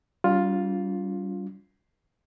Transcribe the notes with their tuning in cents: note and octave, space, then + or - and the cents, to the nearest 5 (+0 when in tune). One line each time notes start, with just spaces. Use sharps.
G3 -25 C#4 +45 F4 +10